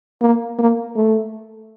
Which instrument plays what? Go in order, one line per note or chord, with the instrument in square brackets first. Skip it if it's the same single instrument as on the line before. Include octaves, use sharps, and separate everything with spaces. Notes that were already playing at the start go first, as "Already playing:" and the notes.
[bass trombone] A#3
A#3
A3